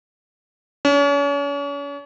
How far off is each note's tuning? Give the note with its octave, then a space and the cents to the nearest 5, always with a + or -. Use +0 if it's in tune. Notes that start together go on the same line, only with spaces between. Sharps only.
C#4 +40